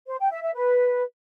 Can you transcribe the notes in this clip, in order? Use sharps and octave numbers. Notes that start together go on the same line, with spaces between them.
C5
G5
E5
E5
B4